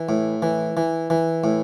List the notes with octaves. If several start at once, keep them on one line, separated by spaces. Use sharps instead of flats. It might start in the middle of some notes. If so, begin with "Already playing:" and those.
Already playing: E3
A2
E3
E3
E3
A2